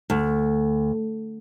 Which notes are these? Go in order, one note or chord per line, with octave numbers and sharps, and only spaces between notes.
D2